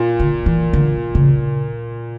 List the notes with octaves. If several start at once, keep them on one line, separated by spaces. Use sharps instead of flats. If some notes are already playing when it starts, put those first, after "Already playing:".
Already playing: A#2
D3
E3
D3
C#3